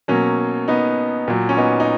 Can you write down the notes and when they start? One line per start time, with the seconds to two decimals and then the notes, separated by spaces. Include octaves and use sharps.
0.08 B2 F#3 A#3 C#4
0.68 B3 D#4
1.28 A#2 F#3
1.49 C#4
1.57 B3 D#4
1.80 D#4